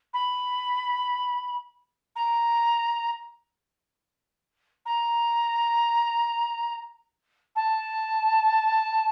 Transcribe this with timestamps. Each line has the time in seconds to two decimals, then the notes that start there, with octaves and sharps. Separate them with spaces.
0.13 B5
2.15 A#5
4.85 A#5
7.55 A5